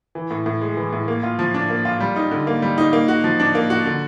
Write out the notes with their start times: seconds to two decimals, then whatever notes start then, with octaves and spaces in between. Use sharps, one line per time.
0.15 E3
0.31 A2
0.46 A2
0.61 G#3
0.77 E3
0.93 A2
1.08 A#3
1.23 F4
1.39 F3
1.54 D4
1.70 A#3
1.85 F4
2.00 G3
2.16 D#4
2.31 D3
2.47 A#3
2.62 G3
2.78 D#4
2.93 A#3
3.08 F#4
3.24 F3
3.40 D4
3.55 A#3
3.70 F#4
3.86 D3